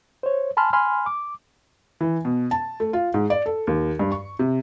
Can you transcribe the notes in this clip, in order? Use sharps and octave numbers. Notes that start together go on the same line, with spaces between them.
C5 C#5
G#5 A5 B5 C6 F6
G#5 B5 C6 F6
D6
E3
B2
A5
A3
F4
G#2
D5
A4
D#2
G2
C#6
C3